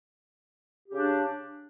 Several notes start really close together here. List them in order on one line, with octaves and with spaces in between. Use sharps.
G4 C#3 D4